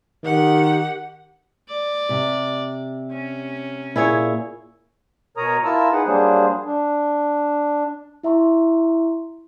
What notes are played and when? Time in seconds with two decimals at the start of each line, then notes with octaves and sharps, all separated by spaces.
0.24 D#3 G4 F#5
1.69 D5
2.09 C3
3.11 C#4
3.96 A#2 E4 G#4 C#5
5.37 B2 A#4 C#5 A#5 D#6
5.65 E4 F4 A#4 A5 E6
5.92 D#4 G#4 B4 F#5
6.06 F#3 G3 A#3 D4 G#4 C5
6.65 D4
8.23 E4 E5 A#5 C6 C#6